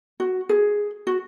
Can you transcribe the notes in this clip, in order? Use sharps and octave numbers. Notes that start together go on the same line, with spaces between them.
F#4
G#4
F#4